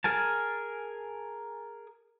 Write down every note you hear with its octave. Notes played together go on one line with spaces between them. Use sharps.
G#4 A#4 G#5 A5